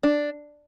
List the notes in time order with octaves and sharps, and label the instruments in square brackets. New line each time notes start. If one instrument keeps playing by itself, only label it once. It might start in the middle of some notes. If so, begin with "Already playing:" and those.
[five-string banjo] D4